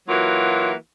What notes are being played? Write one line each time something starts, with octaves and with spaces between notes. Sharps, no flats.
E3 F#3 A#3 F4 F#4